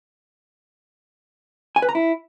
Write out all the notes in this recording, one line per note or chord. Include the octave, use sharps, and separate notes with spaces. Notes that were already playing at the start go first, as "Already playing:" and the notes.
G#5
B4
A#5
E4